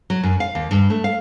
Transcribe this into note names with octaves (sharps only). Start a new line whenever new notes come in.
F#3
F#2
F5
D#2
G2
A3
F5